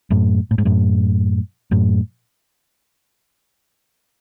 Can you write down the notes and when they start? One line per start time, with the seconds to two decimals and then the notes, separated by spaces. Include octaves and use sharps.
0.10 F#2 A2
0.51 A2
0.58 G#2
0.65 F#2 A2
1.71 F#2 A2